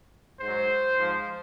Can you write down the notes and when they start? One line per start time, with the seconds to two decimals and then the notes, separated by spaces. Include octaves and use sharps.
0.41 G#2 F#3 C5
0.97 G#2 F3